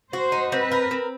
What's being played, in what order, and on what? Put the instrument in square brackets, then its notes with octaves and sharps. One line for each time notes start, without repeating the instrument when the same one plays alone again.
[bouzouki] F#4 [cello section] C5
[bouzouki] D#4
[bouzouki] C4 [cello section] B4
[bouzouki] A#4
C4